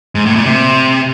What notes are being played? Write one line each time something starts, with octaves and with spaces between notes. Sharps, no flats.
G#2
A2
A#2
C3